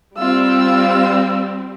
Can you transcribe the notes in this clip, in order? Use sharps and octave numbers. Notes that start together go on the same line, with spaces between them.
G3 C4 F4 E6